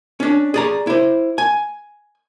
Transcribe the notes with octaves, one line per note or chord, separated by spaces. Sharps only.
C#4 D4
G#4 D5 A#5
E4 C5
G#5